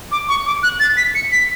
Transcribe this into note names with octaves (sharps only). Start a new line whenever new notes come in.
D6
C#6
D6
F#6
A6
B6
C#7
B6